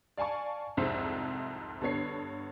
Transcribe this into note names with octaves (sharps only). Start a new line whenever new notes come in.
D5 F5 G#5 A5 C#6
C2 F2 G#2 C5 E5
G2 D3 B3 C#5 C7